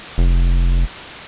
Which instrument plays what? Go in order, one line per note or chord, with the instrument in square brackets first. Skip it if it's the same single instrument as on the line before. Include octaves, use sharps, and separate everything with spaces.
[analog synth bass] F1